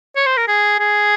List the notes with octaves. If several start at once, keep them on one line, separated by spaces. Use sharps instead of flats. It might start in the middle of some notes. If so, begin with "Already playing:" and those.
C#5
C5
A#4
G#4
G#4